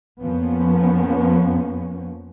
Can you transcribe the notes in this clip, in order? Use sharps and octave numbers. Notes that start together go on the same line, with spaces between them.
F2 F3 A#3 B3 C#4